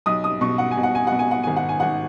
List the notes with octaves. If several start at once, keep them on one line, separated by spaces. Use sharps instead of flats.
B1 D#6
D#6
B2 C#6
F#5
G#5
B2
F#5
G#5
B2 F#5
G#5
F#5
G#1 G#5
F#5
G#5
G#1 F#5